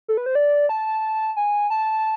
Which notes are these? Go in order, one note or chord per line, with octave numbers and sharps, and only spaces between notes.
A4
B4
C5
D5
A5
G#5
A5